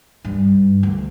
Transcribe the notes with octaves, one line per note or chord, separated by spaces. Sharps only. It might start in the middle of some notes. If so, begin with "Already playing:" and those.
G2
D2